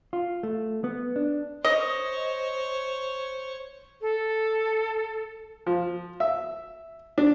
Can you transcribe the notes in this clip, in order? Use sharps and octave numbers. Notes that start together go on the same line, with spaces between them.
F4
A3
B3
D4
C5 C#5 D#5
A4
F3
E5
D4